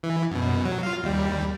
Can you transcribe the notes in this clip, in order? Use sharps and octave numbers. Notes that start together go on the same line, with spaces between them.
E3
F#2 B2
F#3
F4 F5
D#2 G3